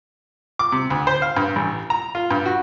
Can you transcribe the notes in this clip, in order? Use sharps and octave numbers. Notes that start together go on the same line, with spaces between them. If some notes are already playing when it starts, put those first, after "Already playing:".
D6
C3
D2
C5
F5
G2
A1
A#5
F4
G2
F#4